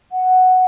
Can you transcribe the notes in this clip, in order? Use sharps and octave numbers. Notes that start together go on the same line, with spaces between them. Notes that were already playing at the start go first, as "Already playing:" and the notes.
F#5